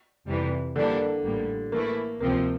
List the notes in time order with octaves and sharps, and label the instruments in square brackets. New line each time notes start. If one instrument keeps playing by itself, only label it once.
[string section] F2 C3 E3 G3
[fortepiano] D3 [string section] E3 G3 A#3 D4 A4
[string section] A1 A2 G3 A#3
[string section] E3 A3 E4 [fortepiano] A#3
[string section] D2 C3 F3 C4 [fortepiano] A#3